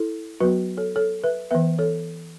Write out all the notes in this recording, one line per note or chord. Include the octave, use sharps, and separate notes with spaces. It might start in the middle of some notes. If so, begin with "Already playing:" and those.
Already playing: E4 A4
F#3 B3 F#4 B4
A4 C#5
A4 C#5
B4 E5
E3 B3 B4 E5
A4 C#5